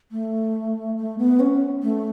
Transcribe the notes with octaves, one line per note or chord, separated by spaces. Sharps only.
A3
A3
B3
C#4
A3